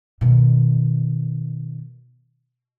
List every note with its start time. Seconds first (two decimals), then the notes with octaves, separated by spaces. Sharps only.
0.21 B2 D#3